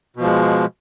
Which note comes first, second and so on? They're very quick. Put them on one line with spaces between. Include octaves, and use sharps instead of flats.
B2 F3 G#3